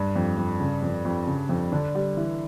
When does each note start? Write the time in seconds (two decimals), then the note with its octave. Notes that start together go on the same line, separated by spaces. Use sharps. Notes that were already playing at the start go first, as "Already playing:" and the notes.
Already playing: G2
0.16 F2
0.38 F2
0.60 C#3
0.82 F2
1.05 F2
1.27 C#3
1.49 F2
1.72 D3 D4
1.95 G3
2.17 E3